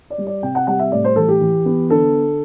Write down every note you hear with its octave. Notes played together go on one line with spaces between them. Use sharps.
D5
G3
D5
C3 G5
F#5
G3 F#5
E5
A2 D5
C5
E3 A4
G4
E3
B3
D3 A4